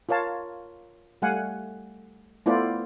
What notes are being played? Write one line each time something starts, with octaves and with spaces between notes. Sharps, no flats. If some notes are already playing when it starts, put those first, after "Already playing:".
F4 A#4 C#5 F5 A5
G3 A3 F5 F#5 G#5
A3 B3 E4 F4 C5 D5